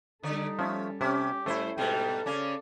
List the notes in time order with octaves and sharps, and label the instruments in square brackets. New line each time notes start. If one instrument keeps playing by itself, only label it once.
[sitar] D3 D5 [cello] G3 A4 [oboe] D#4
[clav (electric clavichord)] F3 A3 [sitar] C#4
[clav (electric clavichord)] C3 [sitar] C#4 [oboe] G4
[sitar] A2 G3 C5 [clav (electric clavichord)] A3 E4
[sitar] G#2 B2 G3 [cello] A4 [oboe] G5
[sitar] C#3 C#4 [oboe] D5